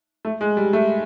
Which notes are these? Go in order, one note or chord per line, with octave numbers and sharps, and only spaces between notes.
A3
G#3
G3
A3